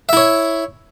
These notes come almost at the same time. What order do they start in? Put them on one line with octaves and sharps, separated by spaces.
E5 E4 C#5